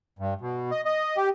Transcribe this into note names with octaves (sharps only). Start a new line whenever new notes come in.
G2
B2
D#5
D#5
G4